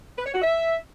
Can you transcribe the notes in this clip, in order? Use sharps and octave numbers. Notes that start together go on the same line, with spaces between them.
B4
C#5
F#4
E5